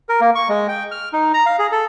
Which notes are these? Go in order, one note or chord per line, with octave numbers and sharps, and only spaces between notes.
A#4
A#3
C#6
G#3
G5
F6
D#4
A#5
F5
G#4
A4